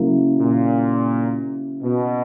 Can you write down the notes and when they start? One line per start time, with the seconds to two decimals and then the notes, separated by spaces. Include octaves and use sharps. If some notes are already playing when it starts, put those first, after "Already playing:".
Already playing: C#3 F#3 A#3 E4
0.39 A#2
1.83 B2